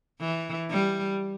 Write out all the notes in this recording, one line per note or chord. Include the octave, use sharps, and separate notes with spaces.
E3
G3